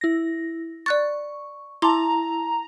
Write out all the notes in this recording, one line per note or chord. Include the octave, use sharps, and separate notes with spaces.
E4 A#6
D5 C#6 F#6 A6
E4 A5 A#5 C6 D6